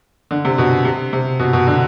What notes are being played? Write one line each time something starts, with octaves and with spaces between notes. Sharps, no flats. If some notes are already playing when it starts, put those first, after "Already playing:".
D3
C3
B2
C3
C3
B2
B2
D3